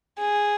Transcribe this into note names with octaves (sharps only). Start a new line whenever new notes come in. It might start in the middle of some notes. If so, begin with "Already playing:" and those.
G#4